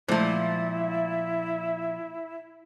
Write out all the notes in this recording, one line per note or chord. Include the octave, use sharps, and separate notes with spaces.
A#2 F3 G#3 A3 E4 C5